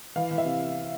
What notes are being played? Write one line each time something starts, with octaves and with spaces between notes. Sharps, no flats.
E3 F5
E3
E5
C3